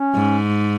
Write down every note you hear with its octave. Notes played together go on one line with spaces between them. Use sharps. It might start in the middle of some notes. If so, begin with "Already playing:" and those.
Already playing: C#4
G#2